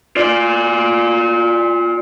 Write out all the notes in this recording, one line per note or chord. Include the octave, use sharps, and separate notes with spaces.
F4 D5